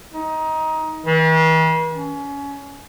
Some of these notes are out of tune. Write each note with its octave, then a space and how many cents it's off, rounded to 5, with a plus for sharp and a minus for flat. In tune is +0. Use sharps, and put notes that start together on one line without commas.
D#4 +20
E3 -45
C#4 +25